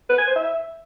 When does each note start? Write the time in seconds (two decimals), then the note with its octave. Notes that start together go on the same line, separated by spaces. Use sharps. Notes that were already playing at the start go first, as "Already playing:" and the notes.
0.10 B4
0.18 G#5
0.27 C5
0.36 E5